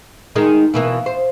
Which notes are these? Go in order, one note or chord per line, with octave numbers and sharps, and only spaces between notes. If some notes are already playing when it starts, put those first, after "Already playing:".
D#3 G#3 D#4
B2 E3 A#3
C5